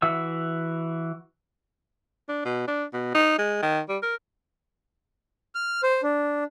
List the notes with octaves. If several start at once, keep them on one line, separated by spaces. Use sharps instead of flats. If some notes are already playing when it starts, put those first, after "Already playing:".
E3 F#4 E5 E6
D4
B2
D4
B2
D#4
G#3
D#3
G3
A#4
F6
C5
D4